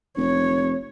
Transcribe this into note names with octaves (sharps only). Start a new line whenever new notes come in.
F1 C#5